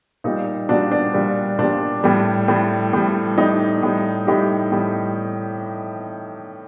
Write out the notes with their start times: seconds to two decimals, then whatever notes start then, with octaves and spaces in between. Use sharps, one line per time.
0.24 A#2 G3 D#4
0.69 A#2 G3 D4 F#4
0.92 D4
1.14 A#2 G3
1.59 A#2 G3 D4
2.04 A2 G3
2.48 A2 G3
2.93 A2 G3
3.38 A2 G3 D#4
3.83 A2 G3
4.27 A2 G3 D#4 G4
4.72 A2 G3